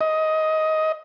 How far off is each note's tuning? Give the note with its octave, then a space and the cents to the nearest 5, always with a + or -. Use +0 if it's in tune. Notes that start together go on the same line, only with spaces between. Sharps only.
D#5 +15